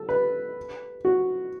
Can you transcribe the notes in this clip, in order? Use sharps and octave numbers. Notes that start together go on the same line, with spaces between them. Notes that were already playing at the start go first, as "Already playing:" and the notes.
Already playing: A4
B4
F#4